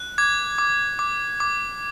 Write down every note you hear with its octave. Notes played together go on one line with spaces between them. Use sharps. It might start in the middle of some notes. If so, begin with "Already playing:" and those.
Already playing: F#6
D6 G#6
D6
D6
D6